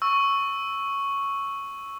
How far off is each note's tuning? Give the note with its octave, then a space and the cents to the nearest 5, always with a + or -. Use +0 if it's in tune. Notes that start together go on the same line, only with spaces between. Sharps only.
C#6 +0 E6 -5